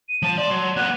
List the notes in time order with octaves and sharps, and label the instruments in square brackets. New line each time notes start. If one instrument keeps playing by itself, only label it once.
[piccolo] D#7
[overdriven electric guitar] F3 A5
[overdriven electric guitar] D5 [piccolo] C6
[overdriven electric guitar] F#3
[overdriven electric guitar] A#3 B3 [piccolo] F#6